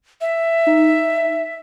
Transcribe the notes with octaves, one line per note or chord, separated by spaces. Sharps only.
E5
D#4